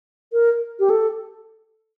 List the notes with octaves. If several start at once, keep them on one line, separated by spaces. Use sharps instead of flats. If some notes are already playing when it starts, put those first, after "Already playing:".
A#4
G4
A4